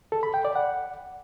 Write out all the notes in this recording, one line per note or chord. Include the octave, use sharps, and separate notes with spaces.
A4
B5
G5
D5
F#5